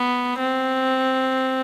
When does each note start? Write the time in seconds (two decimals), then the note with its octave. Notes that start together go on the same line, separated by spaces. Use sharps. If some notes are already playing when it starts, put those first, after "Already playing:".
Already playing: B3
0.38 C4